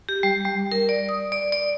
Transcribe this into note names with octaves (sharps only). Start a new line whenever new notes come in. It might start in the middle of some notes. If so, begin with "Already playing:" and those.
G4
G3
G3
A#4
D5
D#6
D5
D5